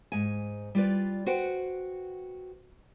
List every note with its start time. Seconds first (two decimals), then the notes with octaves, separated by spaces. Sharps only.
0.12 G#2 G#5
0.75 G3 F4 B4 D5
1.26 F#4 B4 C5 F#5 G5